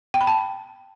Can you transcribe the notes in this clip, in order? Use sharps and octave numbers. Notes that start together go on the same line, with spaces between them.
G5
B5
A5